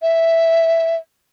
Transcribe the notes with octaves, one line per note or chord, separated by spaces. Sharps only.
E5